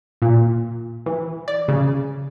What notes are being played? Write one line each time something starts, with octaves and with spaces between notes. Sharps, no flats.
A#2
E3
D5
C#3